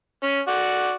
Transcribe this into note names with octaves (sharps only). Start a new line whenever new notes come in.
C#4
F#4 D5